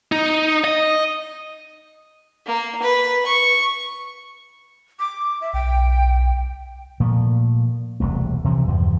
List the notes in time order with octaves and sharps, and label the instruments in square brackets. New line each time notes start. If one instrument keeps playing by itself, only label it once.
[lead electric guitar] D#4
D#5
[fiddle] A#3
B4
C#6
[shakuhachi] D6
E5
[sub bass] B1 [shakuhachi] G5
[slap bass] A#2 F3 A3
E1 C2 A3
C3 E3 F3
E2 G2 C#3 F3